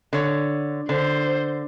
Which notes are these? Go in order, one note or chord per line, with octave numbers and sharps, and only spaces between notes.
D3 C#5
D3 C5